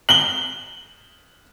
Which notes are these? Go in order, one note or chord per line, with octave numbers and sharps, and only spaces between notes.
F#7 G7